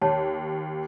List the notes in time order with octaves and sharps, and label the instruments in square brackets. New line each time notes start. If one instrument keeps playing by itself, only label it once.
[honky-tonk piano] D#2 [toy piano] C#5 A5